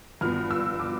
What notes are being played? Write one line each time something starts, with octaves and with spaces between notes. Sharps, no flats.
G2 F3 B3 F6
E6
D6